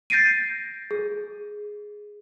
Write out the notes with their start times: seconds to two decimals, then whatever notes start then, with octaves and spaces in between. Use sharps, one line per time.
0.10 G6 A6 A#6 C7 D7 D#7
0.91 G#4